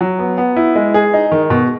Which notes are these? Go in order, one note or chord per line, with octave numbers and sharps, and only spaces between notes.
F#3
B3
B3
E4
G#3
G#4
D#4
D#3
B2